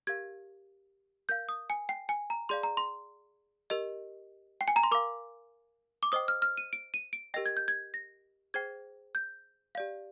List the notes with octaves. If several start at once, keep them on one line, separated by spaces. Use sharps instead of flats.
G4 A#4 F5 G#6
A#4 F5 G6
D#6
G#5
G5
G#5
A#5
G#4 D5 F5 C6
A#5
C6
G4 A#4 D#5
G5
G#5
A#5
C6
A#4 F5 D6
D6
C5 D#5 G5 D#6
F6
F6
D#7
D7
D#7
D7
G4 A#4 D#5 G5 A#6
G#6
G6
G#6
A#6
G#4 C5 G5 G#6
G6
G4 D5 F5